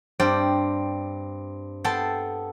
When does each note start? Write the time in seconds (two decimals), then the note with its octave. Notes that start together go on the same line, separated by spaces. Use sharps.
0.20 G2 C4 D5 G5
1.84 B3 A4 G5 A5 C6